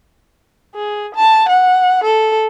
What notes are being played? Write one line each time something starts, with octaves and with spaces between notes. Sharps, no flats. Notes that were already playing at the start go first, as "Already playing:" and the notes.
G#4
A5
F#5
A4